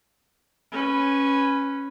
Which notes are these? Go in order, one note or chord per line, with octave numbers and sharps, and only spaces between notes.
C#4 B4